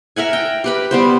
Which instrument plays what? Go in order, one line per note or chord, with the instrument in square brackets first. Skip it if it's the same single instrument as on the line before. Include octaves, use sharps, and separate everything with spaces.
[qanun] A#4 E5 F#5 G#5
G5
G4 B4 B5
G3 B3 C5